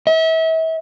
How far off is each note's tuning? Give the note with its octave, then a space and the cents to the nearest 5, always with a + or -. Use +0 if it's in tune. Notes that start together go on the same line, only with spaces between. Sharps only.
E5 -35